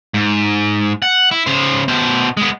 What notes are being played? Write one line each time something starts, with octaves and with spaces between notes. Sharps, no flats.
G#2
F#5
E4
C#3 C5
B2 C5
G#3 B3